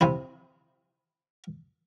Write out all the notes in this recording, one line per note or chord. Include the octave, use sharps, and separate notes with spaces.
C3 C4 E4